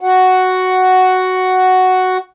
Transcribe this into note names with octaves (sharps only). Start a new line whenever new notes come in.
F#4 F#5